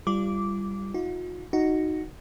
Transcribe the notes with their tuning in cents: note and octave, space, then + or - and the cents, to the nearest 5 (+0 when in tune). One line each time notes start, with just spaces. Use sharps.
G3 +0 F4 -35 D6 -10
D#4 +45 F#4 -45
D#4 +0 F#4 +0